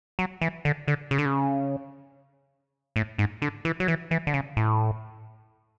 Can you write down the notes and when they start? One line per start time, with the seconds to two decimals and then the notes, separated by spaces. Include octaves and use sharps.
0.19 F#3
0.42 E3
0.65 D3
0.88 D3
1.11 C#3
1.18 D3
1.25 C#3
2.96 A2
3.18 G#2
3.42 D3
3.65 E3
3.80 F#3
3.88 E3
4.11 E3
4.27 D3
4.34 C#3
4.57 A2